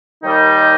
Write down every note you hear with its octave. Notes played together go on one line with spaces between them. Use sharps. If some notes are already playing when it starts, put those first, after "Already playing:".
D#2 D#3 G3 D#4